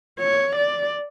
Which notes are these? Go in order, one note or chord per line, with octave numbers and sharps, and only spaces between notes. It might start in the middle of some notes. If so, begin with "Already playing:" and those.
C#5
D5